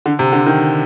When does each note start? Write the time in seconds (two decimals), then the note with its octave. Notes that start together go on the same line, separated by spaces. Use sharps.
0.06 D3
0.19 C3
0.32 D3
0.46 D#3